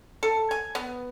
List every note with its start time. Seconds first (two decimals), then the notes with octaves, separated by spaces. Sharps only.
0.23 A4
0.51 G#5
0.75 B3